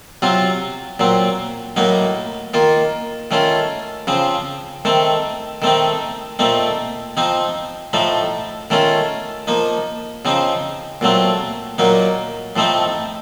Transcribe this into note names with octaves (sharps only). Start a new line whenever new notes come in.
C3 F#3 C4 F4
A#2 F#3 C4
A2 F#3 A#3 D#4
D#3 A#3 F4
D#3 A3 C#4 F4
C#3 F3 C4
D#3 A3 C4
D#3 A3 C4 D#4
A#2 A3 C4 D#4
F3 C4 D#4
A2 F3 A3 D#4
D#3 A3 C#4 F4
F3 A#3 D#4
C#3 F3 C4 D#4
A#2 F#3 A3 C4
A#2 F#3 A#3 D#4
A2 F3 A3 C4 D#4